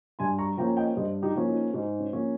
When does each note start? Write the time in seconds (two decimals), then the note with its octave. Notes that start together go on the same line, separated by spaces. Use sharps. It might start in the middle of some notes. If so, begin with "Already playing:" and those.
0.19 G2 G#5 C6
0.38 A#5 C#6
0.57 F3 A#3 C#4 G5 A#5
0.77 D#5 G5
0.97 G2 C5 D#5
1.22 D#4 G4
1.36 F3 A#3 C#4
1.48 D#4
1.74 G#2 D#4
2.00 C#4
2.13 F3 A#3 C#4